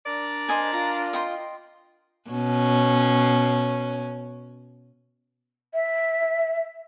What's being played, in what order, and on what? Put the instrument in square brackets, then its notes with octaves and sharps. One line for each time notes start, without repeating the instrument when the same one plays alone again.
[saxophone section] D4 A#4 D5
[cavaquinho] C5 D#5 G#5
[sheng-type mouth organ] F4 [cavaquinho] A#5
[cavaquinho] D#5 G5 C6
[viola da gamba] B2 C#4
[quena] E5